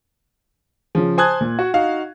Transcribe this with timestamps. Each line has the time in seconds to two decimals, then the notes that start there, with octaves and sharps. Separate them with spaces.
0.95 C#3 F3
1.18 C5 G#5 A5 D#6 F#6 G#6
1.41 A#2
1.59 F#4
1.74 D#4 F#4 F5